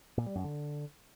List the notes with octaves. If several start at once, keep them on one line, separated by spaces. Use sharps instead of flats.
A#2
G3
F#2
D3